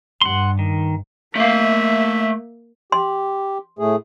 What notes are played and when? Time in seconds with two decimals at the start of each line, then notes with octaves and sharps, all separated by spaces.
0.22 G2 F#5 C6
0.59 D#3
1.36 A3 A#3 E5 F5
2.92 G4 C6
3.79 A2 A3 G#4